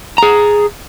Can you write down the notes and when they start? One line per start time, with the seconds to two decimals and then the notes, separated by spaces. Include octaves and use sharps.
0.18 G#4 A#5